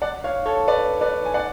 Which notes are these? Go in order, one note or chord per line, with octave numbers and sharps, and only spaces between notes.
D5 F#5
C#5 F5
A4 C#5
B4 D5
B4 D5
G#5
D5 F#5